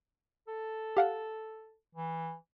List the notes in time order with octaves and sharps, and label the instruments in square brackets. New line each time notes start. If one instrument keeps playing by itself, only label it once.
[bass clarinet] A4
[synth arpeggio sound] G4 F5 F#5
[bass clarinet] E3